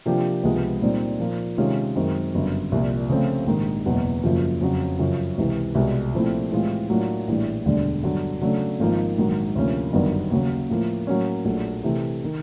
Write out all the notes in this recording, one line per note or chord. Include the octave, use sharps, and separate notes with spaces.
C3 F3 A#3 D4 G4
C#2 C3 F3 G#3 B3
A#2 G3 C4 D#4
A#2 F3 A#3
C3 D#3 G#3 C#4 F4
F#2 D#3 G#3 C4
G1 F#2 C#3
C2 A#2 F3
C#3 F3 A3 C4 F4
A#1 G#2 D#3
F#1 E2 B2 F#3
F#1 F#2 C#3 F3
F2 C#3 F#3
F#2 C#3 F3
C#2 C3 E3
C2 B2 G#3
A#2 F3 A3 C4 E4
A2 E3 G#3 C4 F4
A2 F#3 A#3 D4 F4
A#1 A2 E3 G3
E1 D2 D3 G3
G2 D3 F#3
C#3 F#3 A3 D4
G#1 G#2 F3 A#3 D#4
A#1 G#2 D#3 F#3
D2 C3 F3 A#3 C#4
G1 F#2 D#3 G3 B3
D#2 C#3 F#3
A2 F3 A#3
A2 F#3 A#3 C#4
A#1 A#2 F#3 A3
C3 E3 A3
D#3